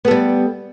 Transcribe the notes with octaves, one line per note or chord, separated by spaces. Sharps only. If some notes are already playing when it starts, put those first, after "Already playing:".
G3 B3 A4